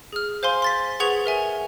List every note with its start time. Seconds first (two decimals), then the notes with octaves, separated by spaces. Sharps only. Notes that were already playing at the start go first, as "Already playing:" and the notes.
0.13 G#4 F6
0.43 C5 F5 G#5 C6
0.62 C6 A6 B6
1.00 G#4 B4 F#5 C#6 G#6 F7
1.26 A#4 E5 G#5